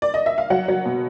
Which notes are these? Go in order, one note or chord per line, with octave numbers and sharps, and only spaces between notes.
D5
D#5
E5
F5
F#3 F#5
F#3
B2